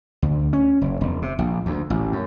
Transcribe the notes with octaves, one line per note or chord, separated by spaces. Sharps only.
D2
C#4
F#1
E1
C3
A#1
D2
A1
F#2